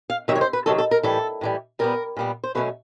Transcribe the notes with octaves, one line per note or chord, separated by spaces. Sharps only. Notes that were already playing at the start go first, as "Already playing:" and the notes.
F5
C3 D#3 F#3 E5
C#5
C5
B4
C3 D#3 F#3 A4
A4
A#4
A2 E3 G3 A4
A2 E3 G3
A#2 G3 B3 A#4
A#2 G3 B3
C5
B2 F#3 A3 C#4 B4